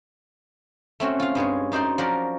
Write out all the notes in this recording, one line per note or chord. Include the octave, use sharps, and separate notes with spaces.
A3 C4 C#4 F#4
F4 F5
G2 G#3 G#4 C#5
F#2 D#4 C5 D5 C6
F3 F#3 C#4 F#4 A#4 D5